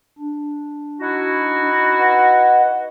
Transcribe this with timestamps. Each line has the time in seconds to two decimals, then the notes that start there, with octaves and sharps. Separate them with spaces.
0.19 D4
1.00 D#4 E4 F#4
1.98 B4 D#5 F#5